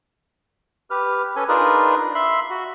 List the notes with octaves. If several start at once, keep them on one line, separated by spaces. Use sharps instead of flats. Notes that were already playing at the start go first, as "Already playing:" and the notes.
G4 B4 F6
C#4 A4 B4 G#5
D4 D#4 F4 G#4 A#4 B4
E5 B5 C6
F#4